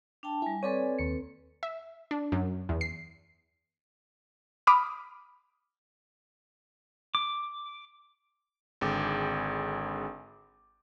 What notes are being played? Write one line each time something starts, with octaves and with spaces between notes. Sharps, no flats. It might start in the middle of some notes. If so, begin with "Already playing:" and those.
D4 G5 A5
G3 E4 G#5
C4 A4 B4 C#5 D5 G#5
D#2 C#7
E5
D4
F#2
E2
C7
B5 D6 D#6 F6
D6
G#1 D3 G#4 G5 D6